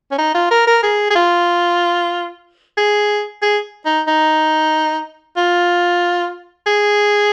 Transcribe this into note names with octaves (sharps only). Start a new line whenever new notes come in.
C#4
D#4
F4
A#4
A#4
G#4
G#4
F4
G#4
G#4
D#4
D#4
F4
G#4